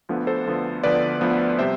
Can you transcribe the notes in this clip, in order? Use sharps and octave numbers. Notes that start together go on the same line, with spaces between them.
D2 D3 F3 B3
A4 C5
D2 D3 F3 B3
D2 D3 F3 B3 B4 D5
D2 D3 F3 B3
C3 G3 C5 E5